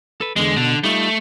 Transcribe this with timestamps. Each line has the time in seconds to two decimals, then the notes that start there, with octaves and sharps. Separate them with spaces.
0.21 A4 B4
0.36 E2 D3 G#3
0.56 B2 D3
0.84 G3 A3 D#4 F4